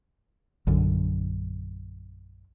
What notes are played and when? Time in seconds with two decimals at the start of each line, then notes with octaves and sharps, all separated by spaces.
0.67 A#1 F#2 D3